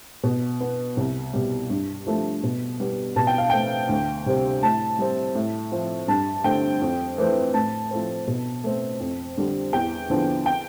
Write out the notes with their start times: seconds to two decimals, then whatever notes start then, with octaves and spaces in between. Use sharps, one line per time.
0.24 B2
0.61 B3
0.97 C2
1.33 B2 G3
1.70 G2
2.07 F3 A3
2.43 B2
2.80 G3 B3
3.16 B2 A5
3.27 G5
3.38 F5
3.50 A3 C4 G5
3.89 D2
4.26 C3 G3 C4
4.63 A2 A5
4.99 G3 C4
5.35 A2
5.72 F3 C4
6.08 G2 A5
6.44 D3 A3 C4 G5
6.82 F2
7.18 E3 A3 C4
7.54 A2 A5
7.91 F3 A3 C4
8.28 B2
8.64 A3 C4
9.00 F2
9.37 D3 G3 C4
9.73 E2 G5
10.10 D3 F3 B3
10.46 G5